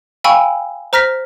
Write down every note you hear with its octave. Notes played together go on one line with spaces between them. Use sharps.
F5 G5 G#5 B5 C#6 E6
C5 A#5 F6 A#6 B6